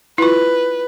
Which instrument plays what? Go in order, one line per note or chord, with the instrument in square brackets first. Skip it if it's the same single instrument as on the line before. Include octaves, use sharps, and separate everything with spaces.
[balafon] E4 F4 [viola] B4